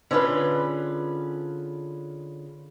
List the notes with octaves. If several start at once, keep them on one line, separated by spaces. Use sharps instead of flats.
D3 C#4 E4 F4 G#4 B4